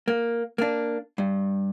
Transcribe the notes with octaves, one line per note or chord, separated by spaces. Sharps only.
A#3
A#3 D4
G2